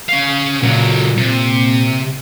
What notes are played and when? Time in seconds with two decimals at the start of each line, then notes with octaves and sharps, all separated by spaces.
0.09 C#4 F5
0.63 C#2 A#2 F#3
1.17 C3